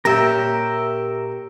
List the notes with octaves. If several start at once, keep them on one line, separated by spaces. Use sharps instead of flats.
A#2 G4 A#4 C#5 E5 G5